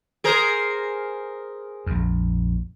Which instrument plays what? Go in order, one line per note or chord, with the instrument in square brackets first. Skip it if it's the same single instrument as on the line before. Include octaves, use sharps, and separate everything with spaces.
[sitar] G#4 A#4 C5
[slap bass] A#1 F2